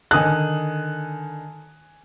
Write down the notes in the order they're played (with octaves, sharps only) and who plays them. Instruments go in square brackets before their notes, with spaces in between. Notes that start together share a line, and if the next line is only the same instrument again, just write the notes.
[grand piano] D3 D#3 [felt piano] G#5 D#6 F#6